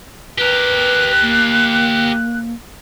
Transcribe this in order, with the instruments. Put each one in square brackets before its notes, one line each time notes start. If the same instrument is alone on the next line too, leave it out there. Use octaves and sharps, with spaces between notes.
[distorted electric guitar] G4 A#4 [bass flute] B4 [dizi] F#6
[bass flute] A#3